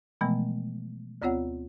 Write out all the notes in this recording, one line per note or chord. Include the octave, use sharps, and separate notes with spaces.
B2 E3 F3 G#3 A3 B3
D2 B3 C4 F4 C#5 F#5